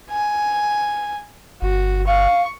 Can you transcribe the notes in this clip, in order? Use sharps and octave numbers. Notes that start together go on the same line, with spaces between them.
G#5
G1 F#4
F5 C#6